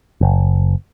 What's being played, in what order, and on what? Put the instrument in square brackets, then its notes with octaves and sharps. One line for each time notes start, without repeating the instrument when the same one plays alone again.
[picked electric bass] F#1